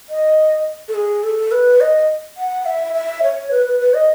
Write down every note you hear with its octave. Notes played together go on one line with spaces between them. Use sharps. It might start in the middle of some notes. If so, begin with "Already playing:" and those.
D#5
A4
G#4
A4
B4
D#5
F#5
E5
E5
C#5
B4
B4
B4
D#5